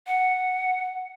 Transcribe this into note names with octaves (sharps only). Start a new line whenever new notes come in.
F#5